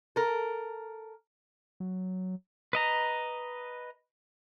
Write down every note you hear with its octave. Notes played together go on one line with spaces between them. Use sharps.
A4 A#4
F#3
B4 D#5 A#5